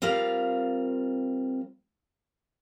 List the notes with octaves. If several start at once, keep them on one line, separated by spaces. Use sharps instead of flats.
G3 C4 F4 A#4 F5